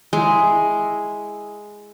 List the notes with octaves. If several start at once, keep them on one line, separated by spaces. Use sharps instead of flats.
G#3 E4